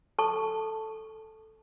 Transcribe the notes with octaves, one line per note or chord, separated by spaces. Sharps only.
A4 A5 C#6